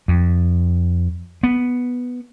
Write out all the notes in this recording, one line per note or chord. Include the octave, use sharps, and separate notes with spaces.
F2
B3